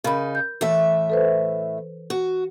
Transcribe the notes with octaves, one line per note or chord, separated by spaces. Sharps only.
C#3 D#4 A#4 B5
G6
A2 E3 A3 E5
A4 B4 C5
F#4